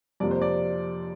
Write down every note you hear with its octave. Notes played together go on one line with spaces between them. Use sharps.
F2 C3 F3 A#3 D5
C5
D5